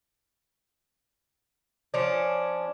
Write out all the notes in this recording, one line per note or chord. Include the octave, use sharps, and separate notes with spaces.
F3 C#4 D4